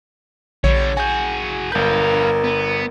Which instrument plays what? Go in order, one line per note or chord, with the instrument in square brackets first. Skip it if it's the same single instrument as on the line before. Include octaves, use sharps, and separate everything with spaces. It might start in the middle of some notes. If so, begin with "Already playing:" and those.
[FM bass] A#1 [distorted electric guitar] D3 G3 [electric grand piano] C#5
[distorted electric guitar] F#4 G#4 [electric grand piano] G#5 G6
[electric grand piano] G1 G6 [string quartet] A#4 [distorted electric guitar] B4 F5
[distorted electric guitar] B3